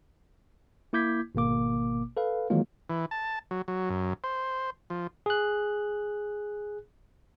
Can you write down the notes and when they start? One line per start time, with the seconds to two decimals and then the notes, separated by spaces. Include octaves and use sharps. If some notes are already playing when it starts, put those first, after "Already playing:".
0.93 A#3 E4 D6 G6 G#6 B6
1.35 G#1 B2 A#3 D6
2.17 A4 B4 F5
2.50 D#3 E3 F#3 G#3 A#3 F4
2.90 E3
3.11 A5
3.51 F#3
3.68 F#3
3.89 F#2
4.24 C5
4.90 F3
5.26 G#4 F#6